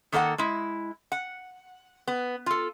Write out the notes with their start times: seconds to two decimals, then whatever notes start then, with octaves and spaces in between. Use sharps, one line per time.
0.12 D#3 A#3 A4 B4 F#5
0.38 G#3 E4
1.12 F#5
2.07 B3
2.46 F4 A4